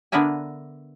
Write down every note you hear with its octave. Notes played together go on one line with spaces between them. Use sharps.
D3 B3 D4 A#4 E5 G#5